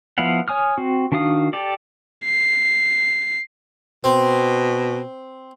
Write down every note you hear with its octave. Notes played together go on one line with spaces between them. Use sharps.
F3 B3 E4 F5 F#5
C#5 G#5 D#6 F6
C4 F#4
D#3 D4 F#4 F5 D#6
G4 A4 D5
C7
B2 C4